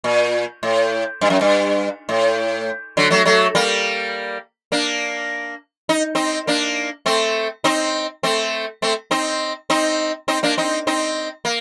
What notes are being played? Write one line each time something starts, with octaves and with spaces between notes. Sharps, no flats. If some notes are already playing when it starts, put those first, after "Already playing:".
A#2
A2
G2
F#2
G2
A2
D3 F#3
F#3 A3
F#3 A3
G3 A#3
A#3 D4
D#4
C4 D#4
A#3 D4
A3 C4
C4 D#4
A3 C4
A3 C4
C4 D#4
C4 D#4
C4 D#4
A#3 D4
C4 D#4
C4 D#4
A#3